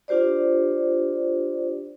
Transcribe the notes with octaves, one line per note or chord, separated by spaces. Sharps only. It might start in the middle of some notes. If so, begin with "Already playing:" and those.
D4 F4 G4 C5 D5